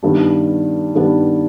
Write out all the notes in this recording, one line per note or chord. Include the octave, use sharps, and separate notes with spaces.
G2 D#3 G3 B3 D4
G2 D#3 G3 B3 D4